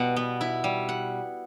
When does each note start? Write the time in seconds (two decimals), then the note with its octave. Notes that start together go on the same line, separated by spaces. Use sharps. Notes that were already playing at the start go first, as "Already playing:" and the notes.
Already playing: B2 G3 E4 F#5
0.16 B3
0.41 E4
0.64 G3
0.89 F#5